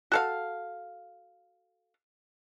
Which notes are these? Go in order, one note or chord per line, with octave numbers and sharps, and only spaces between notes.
F#4 A4 F5